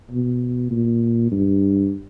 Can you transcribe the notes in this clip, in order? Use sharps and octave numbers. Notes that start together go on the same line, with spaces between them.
B2
A#2
G2